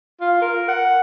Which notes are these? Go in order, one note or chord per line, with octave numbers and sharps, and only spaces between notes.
F4
A#4
F#5